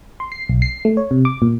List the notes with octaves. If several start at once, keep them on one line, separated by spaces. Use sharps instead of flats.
C6
C7
B1
C7
A3
C#5
C3
D6
A#2